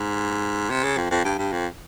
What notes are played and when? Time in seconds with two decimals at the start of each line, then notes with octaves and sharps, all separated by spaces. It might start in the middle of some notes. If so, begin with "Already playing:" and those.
Already playing: G#2
0.70 C3
0.84 C#3
0.98 F2
1.11 F2
1.25 G2
1.38 G2
1.52 F2